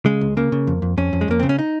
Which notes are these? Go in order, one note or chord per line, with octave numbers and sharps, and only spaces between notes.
C#3 G#3
C#2
C#3 A#3
C#3
F2
F2
F2 C#4
F2
G#3
F2 A#3
C#3 C4
C#4
D#4